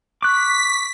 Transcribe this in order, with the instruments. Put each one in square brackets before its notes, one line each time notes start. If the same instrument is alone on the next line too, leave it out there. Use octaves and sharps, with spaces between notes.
[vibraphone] C#6 [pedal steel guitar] D6 F#6 [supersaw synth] B6